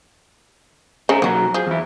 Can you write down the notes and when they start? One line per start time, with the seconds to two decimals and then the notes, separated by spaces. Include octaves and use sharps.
1.09 C#3 A3 C5 G#5 A#5
1.22 B1 F#3 A#3 F#4 A#5
1.54 F3 G#4
1.67 E2 E4